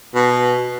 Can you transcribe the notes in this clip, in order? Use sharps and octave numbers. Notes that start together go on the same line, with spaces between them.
B2